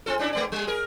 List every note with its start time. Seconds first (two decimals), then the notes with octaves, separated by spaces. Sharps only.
0.06 C4 F4 A4
0.19 C#4 D4 E4
0.33 G#3 B3 D5
0.52 G3 G#3
0.67 G#4 A#4